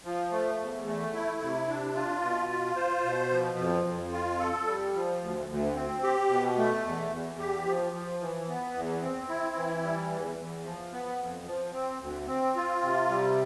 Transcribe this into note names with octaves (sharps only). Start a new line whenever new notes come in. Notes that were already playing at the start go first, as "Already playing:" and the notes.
F3
A3
E2
A3
E4
C3
D4
F4
B2
F4
C5
B2
F3
F2
F2
F4
A4
G3
F3
D2
D2
C4
G4
B2
A3
E2
E2
G4
F3
F3
E3
B3
E2
C4
E4
E3
G3
E2
E2
F3
B3
F2
F3
C4
D2
C4
F4
C3
G3